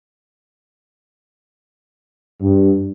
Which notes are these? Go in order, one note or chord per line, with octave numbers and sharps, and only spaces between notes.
G2